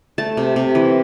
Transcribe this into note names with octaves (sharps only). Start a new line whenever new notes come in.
A3 A5
C3
C3
E3